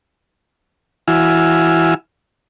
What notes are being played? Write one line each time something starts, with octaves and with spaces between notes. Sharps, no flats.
E3 E4 F#4 G#5 E6 F6